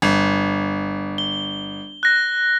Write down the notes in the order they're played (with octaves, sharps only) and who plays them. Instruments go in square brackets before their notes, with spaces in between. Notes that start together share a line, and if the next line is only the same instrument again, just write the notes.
[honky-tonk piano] G1
[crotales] G7
F#6 A#6